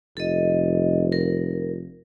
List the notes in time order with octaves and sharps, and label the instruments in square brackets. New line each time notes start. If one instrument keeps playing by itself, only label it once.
[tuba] F1 [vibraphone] A4 D#5
[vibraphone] A#4